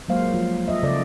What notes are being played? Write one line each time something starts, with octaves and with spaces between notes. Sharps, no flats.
F#3 G#3 A#3 C5 F5
F3 F4
F4 D#5 E5
C#3 A4 D5